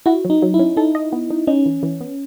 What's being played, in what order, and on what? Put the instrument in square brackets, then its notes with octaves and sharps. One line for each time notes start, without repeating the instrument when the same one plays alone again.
[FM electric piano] E4 [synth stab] F#4
[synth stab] F#3
[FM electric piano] D#4
[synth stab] F#3
[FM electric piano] E4
[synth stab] C#4
[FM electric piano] D#4 [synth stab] A4
[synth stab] D#5
B3
D#4
[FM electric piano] C#4 [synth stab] D#4
[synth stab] E3
E3
B3